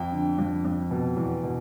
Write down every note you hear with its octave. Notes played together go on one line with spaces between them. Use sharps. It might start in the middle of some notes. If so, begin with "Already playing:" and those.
Already playing: F2 G5
D3
F2
F2
B2
E2
B2